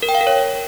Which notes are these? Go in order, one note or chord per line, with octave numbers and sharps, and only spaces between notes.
A#4
G5
F5
A#4
C#5